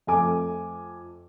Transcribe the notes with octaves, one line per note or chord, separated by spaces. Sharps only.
F2 A3 G#5 D6